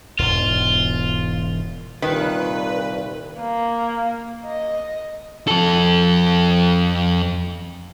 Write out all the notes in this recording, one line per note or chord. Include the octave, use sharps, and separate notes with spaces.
E1 E2 G#2 F4
C2 A#2 D#3 B4
A#3
D#5
F2 A4